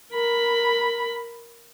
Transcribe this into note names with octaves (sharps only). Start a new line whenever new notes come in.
A#4 B5